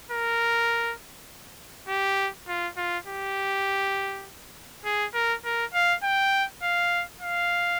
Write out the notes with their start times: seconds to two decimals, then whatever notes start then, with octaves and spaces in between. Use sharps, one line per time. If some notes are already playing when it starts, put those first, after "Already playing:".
0.11 A#4
1.88 G4
2.48 F4
2.77 F4
3.07 G4
4.85 G#4
5.14 A#4
5.45 A#4
5.74 F5
6.04 G5
6.63 F5
7.22 F5